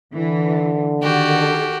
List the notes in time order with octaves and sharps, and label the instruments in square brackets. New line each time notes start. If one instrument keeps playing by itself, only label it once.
[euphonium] D3 [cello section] E3
[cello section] D#3 A4 [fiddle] F#4 G4